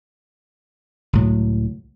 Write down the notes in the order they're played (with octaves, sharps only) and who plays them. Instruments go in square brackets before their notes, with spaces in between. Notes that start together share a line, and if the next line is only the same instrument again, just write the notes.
[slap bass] C#2 A2 F#3